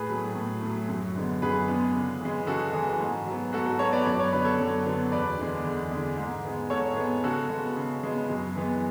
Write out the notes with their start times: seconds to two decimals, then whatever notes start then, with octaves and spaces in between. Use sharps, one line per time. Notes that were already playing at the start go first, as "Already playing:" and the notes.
Already playing: A2 G#4 B4
0.09 F#3 A3
0.35 A2
0.62 F#3 A3
0.88 F#2
1.16 D3 G#3 B3
1.42 F#2 G#4 B4
1.68 D3 G#3 B3
1.95 C#3
2.21 E3 G#3
2.47 C#3 F#4 A4
2.73 E3 G#3
3.00 G#2
3.26 F#3
3.31 B3
3.53 G#2 F#4 A4
3.66 F#4 A4
3.79 F#3 B3 A4 C#5
3.93 B4 D5
4.06 F#2 D5
4.19 C#5
4.33 D3 F#3 B3 B4
4.44 A4 C#5
4.59 F#2
4.86 D3 F#3 B3
5.12 E2 B4 D5
5.39 D3 G#3
5.64 E2
5.92 D3 G#3
6.18 G#2
6.44 G#3 B3
6.70 G#2 A4 C#5
6.97 G#3 B3
7.24 C#3 F#4 A4
7.50 G#3 B3
7.77 C#3
8.04 G#3 B3
8.29 F#2
8.56 E3 G#3 B3